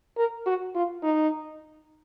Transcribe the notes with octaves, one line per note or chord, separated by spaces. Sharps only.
A#4
F#4
F4
D#4